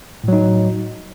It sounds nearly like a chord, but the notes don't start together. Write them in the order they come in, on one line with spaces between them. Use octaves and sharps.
A2 F#3 D#4